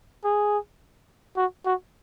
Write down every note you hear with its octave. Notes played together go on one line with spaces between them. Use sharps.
G#4
F#4
F#4